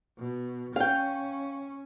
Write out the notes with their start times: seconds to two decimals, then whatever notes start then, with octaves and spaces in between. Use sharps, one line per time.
0.19 B2
0.76 C#4 F5 G5